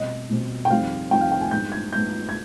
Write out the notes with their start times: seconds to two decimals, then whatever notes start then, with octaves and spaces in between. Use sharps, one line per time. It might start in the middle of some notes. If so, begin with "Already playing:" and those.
Already playing: B2 G3 C4 D#5
0.29 B2 G3 C4
0.65 G5
0.70 F2 D#3 G3 C4 F5
1.11 F2 D#3 G3 C4 G5
1.21 F5
1.32 G5
1.41 G#5
1.51 G#2 G3 B3 D4 G6
1.72 G#6
1.92 G#2 G3 B3 D4 G6
2.29 G#6